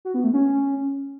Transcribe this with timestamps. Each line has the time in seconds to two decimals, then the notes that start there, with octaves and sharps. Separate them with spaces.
0.05 F#4
0.14 B3
0.24 A3
0.34 C#4